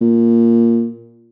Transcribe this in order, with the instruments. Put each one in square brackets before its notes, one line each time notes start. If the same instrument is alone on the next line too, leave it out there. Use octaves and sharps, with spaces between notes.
[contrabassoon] A#2